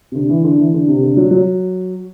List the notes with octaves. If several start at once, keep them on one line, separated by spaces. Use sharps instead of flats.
C3
D3
E3
D3
E3
D3
C3
D3
F#3
F#3